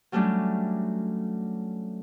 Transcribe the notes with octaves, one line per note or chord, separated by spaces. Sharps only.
F#3 G3 A3 C#4 D4 G4